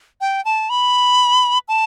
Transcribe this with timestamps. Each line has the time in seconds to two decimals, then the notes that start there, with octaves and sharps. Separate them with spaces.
0.21 G5
0.45 A5
0.70 B5
1.68 A5